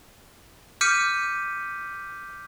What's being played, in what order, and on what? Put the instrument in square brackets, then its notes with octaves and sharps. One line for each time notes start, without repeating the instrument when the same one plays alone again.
[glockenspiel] D6 F6 G6 B6 C#7 D#7